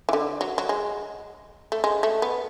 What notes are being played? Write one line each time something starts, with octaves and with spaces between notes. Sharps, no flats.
E3
D3
F#3
F#3
G#3
A3
G#3
A3
B3